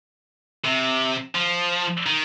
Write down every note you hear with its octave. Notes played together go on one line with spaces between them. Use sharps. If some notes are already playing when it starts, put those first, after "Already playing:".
C3
F3
D#3